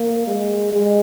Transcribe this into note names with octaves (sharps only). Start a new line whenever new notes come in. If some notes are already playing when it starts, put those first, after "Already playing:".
Already playing: A#3
G#3
G#3